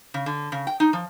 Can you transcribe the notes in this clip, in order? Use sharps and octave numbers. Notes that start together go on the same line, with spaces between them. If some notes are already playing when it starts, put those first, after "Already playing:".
C#3
D3
C#3
G5
D#4
F3